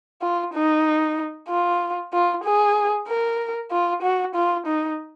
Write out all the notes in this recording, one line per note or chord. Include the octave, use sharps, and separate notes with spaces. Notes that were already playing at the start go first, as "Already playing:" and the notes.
F4
D#4
F4
F4
G#4
A#4
F4
F#4
F4
D#4